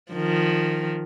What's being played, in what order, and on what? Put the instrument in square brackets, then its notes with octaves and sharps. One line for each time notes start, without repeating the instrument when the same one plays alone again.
[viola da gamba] D#3 F3